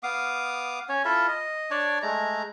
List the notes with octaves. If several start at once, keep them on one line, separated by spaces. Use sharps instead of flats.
B3 F5 D6 D#6
C#4 C#5
E4 F4 A4 E5
D#5
D4 C#5 D5 A5
G#3 A3 A#5